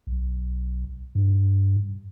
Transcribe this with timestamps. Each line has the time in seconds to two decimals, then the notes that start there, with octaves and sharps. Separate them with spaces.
0.07 B1
1.15 G2